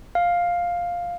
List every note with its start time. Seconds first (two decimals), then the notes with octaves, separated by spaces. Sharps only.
0.15 F5